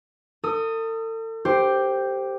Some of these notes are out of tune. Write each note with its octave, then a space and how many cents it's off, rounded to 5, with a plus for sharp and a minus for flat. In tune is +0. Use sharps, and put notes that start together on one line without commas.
A4 +40 D#6 +0
G4 +0 C5 +0